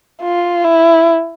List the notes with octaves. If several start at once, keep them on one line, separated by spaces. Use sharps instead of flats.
F4
E4